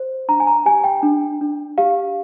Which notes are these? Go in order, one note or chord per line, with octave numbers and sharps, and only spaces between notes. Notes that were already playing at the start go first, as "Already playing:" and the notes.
Already playing: C5
D4 A#5
G#5
A#5
G4 G#5
G5
D4
D4
G4 F5